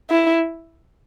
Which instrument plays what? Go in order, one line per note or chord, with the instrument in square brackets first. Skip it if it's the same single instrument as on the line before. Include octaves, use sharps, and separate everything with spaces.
[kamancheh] E4